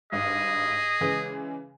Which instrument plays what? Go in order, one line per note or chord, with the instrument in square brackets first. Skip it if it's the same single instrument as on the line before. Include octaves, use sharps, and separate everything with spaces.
[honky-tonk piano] G#1 G2 [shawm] G#4 [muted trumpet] D#5
[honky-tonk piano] C#3 E3 G#3